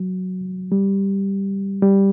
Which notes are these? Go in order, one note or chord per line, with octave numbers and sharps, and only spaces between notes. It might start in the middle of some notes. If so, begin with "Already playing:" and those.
Already playing: F#3
G3
G3